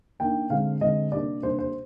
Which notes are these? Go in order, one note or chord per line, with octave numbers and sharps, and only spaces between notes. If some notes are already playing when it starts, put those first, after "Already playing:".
D#3 A#3 D4 G5
D3 G#3 C4 F5
D3 G#3 C4 D#5
C3 G3 A#3 D4 D5
C3 G3 A#3 D4 C5
C5